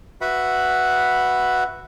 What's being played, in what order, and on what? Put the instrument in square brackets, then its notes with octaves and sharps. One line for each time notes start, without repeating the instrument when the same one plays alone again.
[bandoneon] F#4 B4 E5 F#5 B5